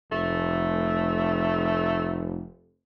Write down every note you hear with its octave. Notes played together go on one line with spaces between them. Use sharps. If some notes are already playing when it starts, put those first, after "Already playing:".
F1 A3